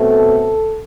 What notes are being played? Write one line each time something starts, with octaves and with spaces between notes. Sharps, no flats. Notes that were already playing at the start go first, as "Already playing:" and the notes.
Already playing: B2 A3 C4 A4